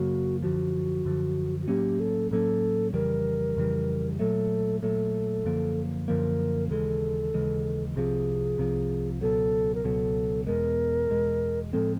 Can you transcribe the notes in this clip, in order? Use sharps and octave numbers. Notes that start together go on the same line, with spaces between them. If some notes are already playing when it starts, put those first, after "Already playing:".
Already playing: F#2 C#3 F#3 A#3 F#4
F#2 D3 F3 F#4
F#2 D3 F3
F#4
A2 F#3 A#3 C#4 G4
A4
A2 F#3 A#3 C#4 A4
F2 C#3 E3 G3 A#4
F2 C#3 E3 G3
A#2 F#3 A3 A4
A#2 F#3 A3 A4
F#2 D3 F3 A#3
F#2 D3 F3 A#3 A#4
D#2 C#3 E3 G#3 A4
D#2 C#3 E3 G#3
C2 C3 F3 G#4
C2 C3 F3
C#2 B2 F#3 A4
A#4
C#2 B2 F#3 A4
E2 B2 G#3 A#4
E2 B2 G#3
A2 F3 G#3 C4 A4